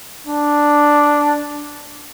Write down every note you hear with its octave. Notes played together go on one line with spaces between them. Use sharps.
D4